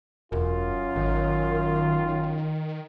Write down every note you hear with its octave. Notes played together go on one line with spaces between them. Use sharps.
E1 F#2 F4
G#1 D#3